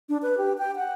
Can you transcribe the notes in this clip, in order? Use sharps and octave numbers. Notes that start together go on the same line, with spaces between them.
D4
B4
G4
G5
F#5